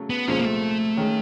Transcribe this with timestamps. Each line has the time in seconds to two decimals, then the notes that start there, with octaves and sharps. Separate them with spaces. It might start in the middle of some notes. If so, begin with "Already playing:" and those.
Already playing: C#3 F#3 A3
0.10 B3
0.28 C2 A#2 F3 G#3 C#4
0.39 A#3
0.45 A3
0.97 D#3 G#3 C#4